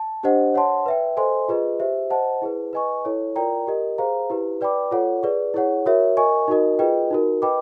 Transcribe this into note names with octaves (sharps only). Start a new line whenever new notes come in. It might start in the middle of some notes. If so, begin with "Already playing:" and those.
Already playing: A5
D4 G4 C5 D#5 F#5
C#5 F#5 A5 C6
B4 E5 G5
A4 C5 D#5 G#5 C6
F4 G#4 B4 D#5
G4 C5 E5
C5 D#5 F#5 A5
E4 G#4 B4
B4 D#5 G#5 C#6
E4 A4 C#5
F4 A#4 D5 G5 A#5
G4 A#4 D#5
G#4 C5 F5 A#5
E4 G4 B4
B4 D5 G5 B5 D6
F4 A4 C#5 F#5
G#4 B4 D5
E4 G#4 C#5 F#5
F#4 A#4 C#5 E5
A#4 D#5 G#5 C#6
D#4 F#4 A#4 D#5
F4 G#4 B4 D#5 G5
D#4 F#4 A#4
B4 D#5 G5 B5 D6